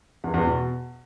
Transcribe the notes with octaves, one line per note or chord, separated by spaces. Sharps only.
E2
E2
B2